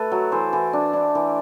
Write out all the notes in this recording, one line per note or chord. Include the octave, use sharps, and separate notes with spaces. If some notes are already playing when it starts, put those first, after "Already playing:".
Already playing: A3 A4 B4
F#3
E3 C5
E3
D4
D4
E3